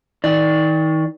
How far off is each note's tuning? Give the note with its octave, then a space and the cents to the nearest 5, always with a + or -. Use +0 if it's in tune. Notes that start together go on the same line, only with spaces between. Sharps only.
D#3 +35 D5 +0